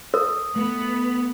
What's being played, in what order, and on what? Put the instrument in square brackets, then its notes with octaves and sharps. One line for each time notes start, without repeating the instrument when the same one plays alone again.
[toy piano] A#4 [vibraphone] D#6
[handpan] A3 [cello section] B3